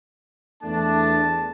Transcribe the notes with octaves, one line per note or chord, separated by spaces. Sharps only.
E2 A3 D4 A5